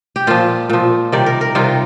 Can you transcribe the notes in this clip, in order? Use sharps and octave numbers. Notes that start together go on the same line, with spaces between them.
G4
A#2 F3 F4
A#2 F3
C3 D#3 G3 D5
A#4
A#4
C3 D#3 G3 F4